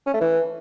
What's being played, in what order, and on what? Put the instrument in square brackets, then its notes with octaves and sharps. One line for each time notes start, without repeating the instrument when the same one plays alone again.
[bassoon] C#4
A3
E3